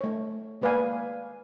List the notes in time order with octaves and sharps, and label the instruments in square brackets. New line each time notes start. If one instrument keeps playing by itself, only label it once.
[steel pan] A3 C#5
G#3 A#3 B4 D5 F5 G#5